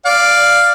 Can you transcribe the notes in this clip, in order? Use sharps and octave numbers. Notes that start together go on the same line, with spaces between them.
D5 F5